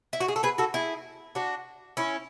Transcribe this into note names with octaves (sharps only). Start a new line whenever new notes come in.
E4
F#4
G#4
A4
G#4 B4
F#4 A4
E4 G#4
D4 F#4
C#4 E4